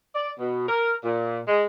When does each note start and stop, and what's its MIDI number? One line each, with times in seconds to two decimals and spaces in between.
0.14 0.30 74
0.39 0.66 47
0.67 0.93 70
1.05 1.40 46
1.48 1.64 56